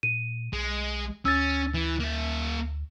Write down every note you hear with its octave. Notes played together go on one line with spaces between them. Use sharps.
A#2 D#7
B1 G#3
D2 C#4 E6 A6
E3
A#3 E5